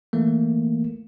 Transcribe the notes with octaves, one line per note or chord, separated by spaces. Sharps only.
E3 A3 A#3